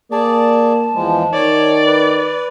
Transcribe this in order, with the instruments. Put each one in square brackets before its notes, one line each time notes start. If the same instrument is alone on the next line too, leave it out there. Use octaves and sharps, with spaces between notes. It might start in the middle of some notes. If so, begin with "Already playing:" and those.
[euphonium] A#3 [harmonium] G#4 D5 [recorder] A5
[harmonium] E2 F3 G#3
[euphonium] D#3 [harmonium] C#5 [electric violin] D5
[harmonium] B4